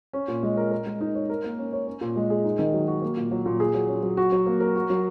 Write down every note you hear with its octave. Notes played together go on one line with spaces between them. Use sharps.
C#4
A#2
G#3
A#4
A#4
G#3
D#4
C#5
A#4
A#3
C#4
C#5
C#4
A#2
G#3
G#4
D#4
D#3
F#3
F#4
A#3
A#2
F#3
A#2
G#4
F#3
C#4
F#3
F#4
F#3
A#3
A#4
F#4
F#3